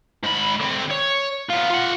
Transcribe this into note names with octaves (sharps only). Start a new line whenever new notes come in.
G#2 B5
D3 C4
C#5
B3 F4
F4 F#5